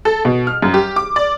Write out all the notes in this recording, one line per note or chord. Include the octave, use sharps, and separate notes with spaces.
A4
B2
F6
F#2
G4
D6
D5